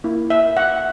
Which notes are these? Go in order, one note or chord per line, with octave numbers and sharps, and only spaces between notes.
A#3 E4
E5
F#5